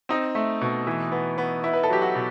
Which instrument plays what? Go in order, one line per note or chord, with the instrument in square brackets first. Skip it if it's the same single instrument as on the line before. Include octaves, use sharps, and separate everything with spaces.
[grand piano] C4 D#4
A3
B2
E3
B3
B3
B3 E4
B4
A4
F#3 G4
F#4
B2